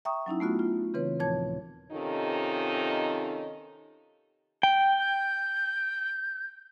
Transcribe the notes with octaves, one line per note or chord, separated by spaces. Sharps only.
E5 G5 A#5 C#6 D#6
F#3 C#4 D#4 E4
A3 B3 F4 F#4
F4
C#3 E3 C4 B4 C#5
D#2 A#2 F3 C#5 A5 G#6
C3 D#3 C#4 D#4 F4 A4
G5
G6